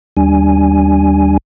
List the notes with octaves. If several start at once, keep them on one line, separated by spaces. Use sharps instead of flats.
D#2 G3 D4 G#5